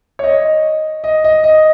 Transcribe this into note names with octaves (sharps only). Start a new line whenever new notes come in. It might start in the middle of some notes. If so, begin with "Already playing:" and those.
C#5
D#5
D#5
D#5
D#5